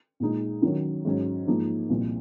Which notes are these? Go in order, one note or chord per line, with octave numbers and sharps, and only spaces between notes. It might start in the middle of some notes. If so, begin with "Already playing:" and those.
A#2 G#3 D#4
D#3 F#3 C#4
G#2 F#3 C#4
G#2 F3 A#3 D#4
C2 A#2 F3